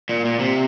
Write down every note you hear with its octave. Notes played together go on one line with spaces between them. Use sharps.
A#2
A#2
C3